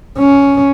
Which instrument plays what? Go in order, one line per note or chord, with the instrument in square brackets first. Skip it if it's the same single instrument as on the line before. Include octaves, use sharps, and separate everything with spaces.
[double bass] C#4